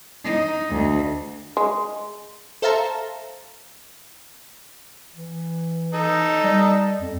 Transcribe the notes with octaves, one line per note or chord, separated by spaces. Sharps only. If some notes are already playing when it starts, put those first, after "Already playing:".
D#4
D2
G#3
A4 C5 E5 F5 A5 A#5
E3
D#4 A4
G3
F2